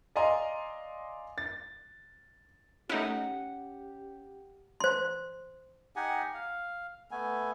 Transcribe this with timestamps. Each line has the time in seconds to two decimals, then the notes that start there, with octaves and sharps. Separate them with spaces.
0.16 D5 D#5 F5 G#5 A#5 C6
1.38 A6
2.89 A3 C#4 D#4 E4 G4 F#5
4.80 C5 C6
5.96 D#4 G4 F#5 G#5
6.34 F5
7.11 A3 B3 G#5